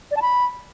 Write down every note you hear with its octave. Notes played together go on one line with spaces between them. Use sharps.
D5
A5
B5